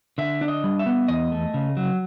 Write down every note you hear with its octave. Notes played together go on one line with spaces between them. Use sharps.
D3 E5
D4
D#5
G3
E5
B3
E2 D#5
A3
C#3
F#3